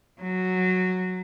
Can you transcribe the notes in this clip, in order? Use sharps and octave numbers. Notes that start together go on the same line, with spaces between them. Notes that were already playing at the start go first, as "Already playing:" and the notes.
F#3